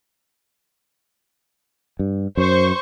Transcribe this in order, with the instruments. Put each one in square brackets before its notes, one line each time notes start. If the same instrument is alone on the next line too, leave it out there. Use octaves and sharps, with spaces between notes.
[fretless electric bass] G2
[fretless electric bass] F#2 [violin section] C5 C#6